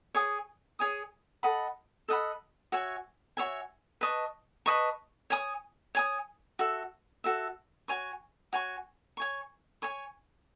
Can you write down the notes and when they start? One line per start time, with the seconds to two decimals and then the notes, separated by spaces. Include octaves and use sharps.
0.15 G#4 C#5 G#5 D#6
0.79 G#4 C#5 G#5 D#6
1.43 A4 D#5 F#5 B5
2.08 A4 D#5 F#5 B5
2.72 F#4 C#5 E5 G#5
3.37 F#4 C#5 E5 G#5
4.01 B4 D#5 A5 C#6
4.66 B4 D#5 A5 C#6
5.30 C#5 G#5 D#6
5.95 C#5 G#5 D#6
6.59 F#4 A4 E5
7.24 F#4 A4 E5
7.88 F#4 C#5 G#5 C#6
8.53 F#4 C#5 G#5 C#6
9.17 C#5 G#5 C#6
9.82 C#5 G#5 C#6